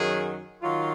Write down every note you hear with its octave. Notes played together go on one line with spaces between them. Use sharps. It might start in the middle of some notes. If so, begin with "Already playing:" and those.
Already playing: F#2 D#3 F#3 G#4
D#3 F#3 F4